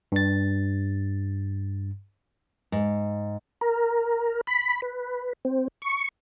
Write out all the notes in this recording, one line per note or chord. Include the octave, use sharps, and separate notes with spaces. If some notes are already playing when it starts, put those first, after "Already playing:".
G2 A6
G#2
A#4
B5
B4
C4
C#6